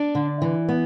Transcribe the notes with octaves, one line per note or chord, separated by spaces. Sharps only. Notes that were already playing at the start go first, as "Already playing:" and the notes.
Already playing: D4 D5
D3
E3
B3